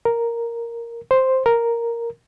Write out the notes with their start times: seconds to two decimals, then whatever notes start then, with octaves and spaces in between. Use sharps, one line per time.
0.05 A#4
1.11 C5
1.46 A#4